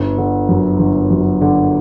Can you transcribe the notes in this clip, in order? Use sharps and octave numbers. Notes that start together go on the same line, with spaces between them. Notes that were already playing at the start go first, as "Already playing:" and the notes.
Already playing: G1
D3
F#2
G1
F#2
D3